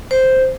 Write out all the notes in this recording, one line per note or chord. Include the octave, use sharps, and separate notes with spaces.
C5